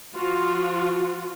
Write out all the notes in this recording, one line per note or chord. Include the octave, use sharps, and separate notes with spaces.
F3 F4 F#4